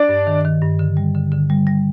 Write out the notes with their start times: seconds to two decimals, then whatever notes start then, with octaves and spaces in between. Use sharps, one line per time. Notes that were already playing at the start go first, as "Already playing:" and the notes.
Already playing: D4 D5
0.09 G2
0.27 D#3
0.45 D#3
0.62 G2
0.79 D3
0.97 G3
1.15 D3
1.32 D3
1.50 G3
1.67 G3